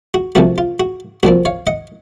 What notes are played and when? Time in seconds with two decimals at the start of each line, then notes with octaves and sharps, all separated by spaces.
0.14 F#4
0.35 C2 C3 F3 A3 F#4
0.58 F4
0.80 F#4
1.23 C2 A#2 F3 C4 F#4
1.45 C#5 F5
1.67 D#5 F#5